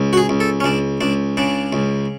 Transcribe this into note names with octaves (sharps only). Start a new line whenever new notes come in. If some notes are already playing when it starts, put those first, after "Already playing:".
Already playing: C#2
F#4
G#4
C#2
A4
C#4
C#2 D4
C#2 D4
C#3 D4
C#2